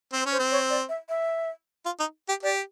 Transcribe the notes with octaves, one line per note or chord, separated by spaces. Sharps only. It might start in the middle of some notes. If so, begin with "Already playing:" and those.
C4 C5
C#4
C5
C4
C#5
D5
E5
E5
F4
D#4
G4
G4 D5